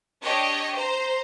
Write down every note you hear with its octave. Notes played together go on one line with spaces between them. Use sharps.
D4 G4 C#5 D#5
C5 A#5